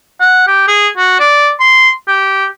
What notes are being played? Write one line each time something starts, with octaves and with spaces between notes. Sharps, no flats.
F#5
G4
G#4
F#4
D5
C6
G4